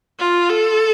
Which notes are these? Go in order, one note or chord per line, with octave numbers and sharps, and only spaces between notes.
F4
A4